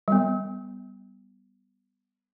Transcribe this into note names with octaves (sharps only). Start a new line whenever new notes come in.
G3 B3